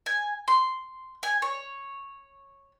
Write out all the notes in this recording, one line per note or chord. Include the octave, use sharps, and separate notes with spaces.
G#5
C6
G#5
C#5